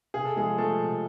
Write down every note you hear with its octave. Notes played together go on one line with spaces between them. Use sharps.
C3 G#4
A4
F3 G#3 G#4
F3 A3 A4
C3